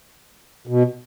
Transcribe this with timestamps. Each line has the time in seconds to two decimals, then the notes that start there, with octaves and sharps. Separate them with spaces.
0.67 B2